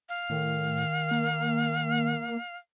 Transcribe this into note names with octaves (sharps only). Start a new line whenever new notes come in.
F5
A2 D#3
A#3